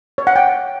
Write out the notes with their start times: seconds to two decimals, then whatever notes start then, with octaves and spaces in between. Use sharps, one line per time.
0.18 C#5
0.27 F#5
0.36 G5